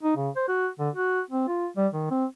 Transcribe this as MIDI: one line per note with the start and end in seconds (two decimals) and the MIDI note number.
0.03 0.16 63
0.17 0.30 49
0.36 0.45 72
0.48 0.69 66
0.79 0.90 50
0.95 1.21 66
1.30 1.47 60
1.48 1.68 65
1.77 1.88 55
1.93 2.07 51
2.11 2.25 60